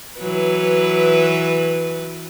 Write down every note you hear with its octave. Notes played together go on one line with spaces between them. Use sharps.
E3 F#3 B4